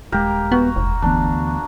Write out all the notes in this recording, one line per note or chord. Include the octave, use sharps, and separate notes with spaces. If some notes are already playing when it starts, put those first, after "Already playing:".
D#1 G#3 A#3 G4 A#4
B3 F#4
F1
D2 E3 B3 D4